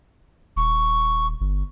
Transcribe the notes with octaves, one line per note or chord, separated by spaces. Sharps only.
D#1 C#6
G1